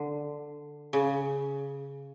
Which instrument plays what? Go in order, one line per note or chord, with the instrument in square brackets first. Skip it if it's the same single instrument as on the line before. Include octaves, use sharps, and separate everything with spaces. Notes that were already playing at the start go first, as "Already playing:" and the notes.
Already playing: [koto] D3
C#3